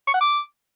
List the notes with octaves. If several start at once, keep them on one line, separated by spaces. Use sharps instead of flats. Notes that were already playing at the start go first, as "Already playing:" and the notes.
C#6
F#5
D6